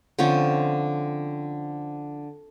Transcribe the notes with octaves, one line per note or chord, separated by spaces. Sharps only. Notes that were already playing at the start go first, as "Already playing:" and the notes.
D3 F3 C4 C#4